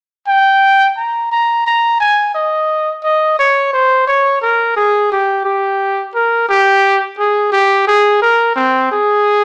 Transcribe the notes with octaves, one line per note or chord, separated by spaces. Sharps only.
G5
A#5
A#5
A#5
G#5
D#5
D#5
C#5
C5
C#5
A#4
G#4
G4
G4
A#4
G4
G#4
G4
G#4
A#4
C4
G#4